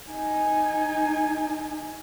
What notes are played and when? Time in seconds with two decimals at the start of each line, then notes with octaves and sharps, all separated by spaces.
0.11 D#4 G#5